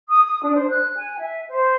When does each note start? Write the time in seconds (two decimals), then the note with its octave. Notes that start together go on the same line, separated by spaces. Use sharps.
0.08 D#6
0.24 D#6
0.43 D4
0.55 C5
0.70 F#6
0.96 G#5
1.19 E5
1.49 C5